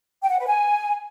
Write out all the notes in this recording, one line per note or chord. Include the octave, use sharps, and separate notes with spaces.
G5
F#5
B4
G#5